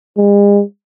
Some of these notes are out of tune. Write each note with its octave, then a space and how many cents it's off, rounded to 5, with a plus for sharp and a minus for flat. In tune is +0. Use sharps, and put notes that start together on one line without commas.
G#3 -45